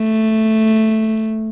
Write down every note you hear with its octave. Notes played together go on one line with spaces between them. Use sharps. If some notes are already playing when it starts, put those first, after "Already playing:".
Already playing: A3